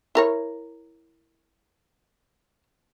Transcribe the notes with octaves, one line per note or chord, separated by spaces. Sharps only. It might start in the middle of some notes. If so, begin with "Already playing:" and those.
E4 A#4 C#5